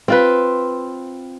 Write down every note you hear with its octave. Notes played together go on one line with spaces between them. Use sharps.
C4 F4 B4